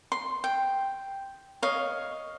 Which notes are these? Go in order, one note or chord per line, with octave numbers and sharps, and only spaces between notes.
C6
G5
C#5 D#5 F5